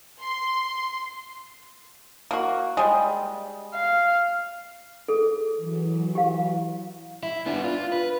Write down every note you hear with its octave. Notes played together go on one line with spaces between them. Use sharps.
C6
A#3 F#4
G3 G#3
F5
G#4 A4
E3 F#3
G4 F5
E4
B3 D4
F4
B4